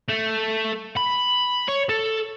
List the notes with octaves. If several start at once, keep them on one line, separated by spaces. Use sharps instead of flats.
A3
B5
C#5
A4